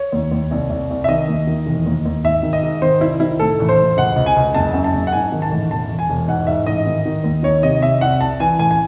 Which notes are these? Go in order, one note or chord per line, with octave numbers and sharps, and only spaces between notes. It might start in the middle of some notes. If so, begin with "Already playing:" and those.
Already playing: C#5
D#2
D#2
C2
C2
C2
E5
D#3 D#5
D#2
D#3
E1
D#2
D#2
G#2 E5
D#3
D#5
G#2
D#3 C5
C2 E4
D#3 E4
A2 A4
A1
C5
A1
C#2 F#5
C#2
G#5
C#2
F#1 A5
F#2
A5
F#1
F#5
G#2 G#5
D#3
A5
A1
E1 A5
E1
G#5
E1
G#2 F#5
G#2 E5
A1 D#5
D#3
D#3
D#2
D#3 C#5
C3 D#5
C3 E5
C2 F#5
C2 A5
E3 G#5
A1 G#5
G#5